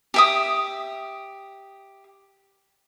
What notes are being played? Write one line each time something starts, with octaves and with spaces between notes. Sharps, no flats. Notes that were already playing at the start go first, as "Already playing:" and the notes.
G4 E5 D#6